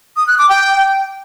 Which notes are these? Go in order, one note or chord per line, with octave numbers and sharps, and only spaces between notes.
D#6
F#6
D6
G5